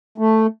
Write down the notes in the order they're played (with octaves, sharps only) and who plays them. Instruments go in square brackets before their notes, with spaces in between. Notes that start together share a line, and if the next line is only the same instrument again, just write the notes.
[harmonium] A3